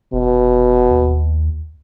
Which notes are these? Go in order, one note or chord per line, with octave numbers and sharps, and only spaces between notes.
F1 B2
D#2